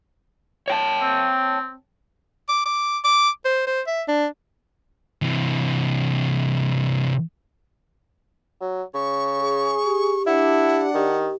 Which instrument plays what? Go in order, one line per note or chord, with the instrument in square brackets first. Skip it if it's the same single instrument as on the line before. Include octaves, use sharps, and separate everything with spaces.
[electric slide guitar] C#5 G5 A5
[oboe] C4
[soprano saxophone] D6
D6
D6
C5
C5
E5
D4
[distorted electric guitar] C3 E3
[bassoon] F#3
[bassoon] C#3 [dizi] C#6
[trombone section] G#4
[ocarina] G4
[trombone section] D4 [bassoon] E4 [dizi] F#5
[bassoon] D#3 [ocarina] G4